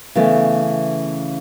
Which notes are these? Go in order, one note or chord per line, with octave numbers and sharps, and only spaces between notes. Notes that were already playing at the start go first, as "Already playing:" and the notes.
C#3 E3 A3 B3